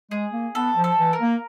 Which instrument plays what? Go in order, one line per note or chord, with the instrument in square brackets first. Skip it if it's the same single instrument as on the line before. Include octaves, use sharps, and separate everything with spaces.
[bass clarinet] G#3 [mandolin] G#4
[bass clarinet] A#3
[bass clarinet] B3 [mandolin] A4
[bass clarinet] F3
[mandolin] A4
[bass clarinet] E3
[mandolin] A#4
[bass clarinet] A#3